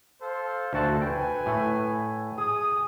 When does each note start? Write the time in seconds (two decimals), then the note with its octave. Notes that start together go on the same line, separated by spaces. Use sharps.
0.21 A4 C5 F5
0.73 D2 F#4 A4 C5 F#5 A5
1.02 B4 G5 G#5
1.46 A2 A3
2.38 G#4 D#6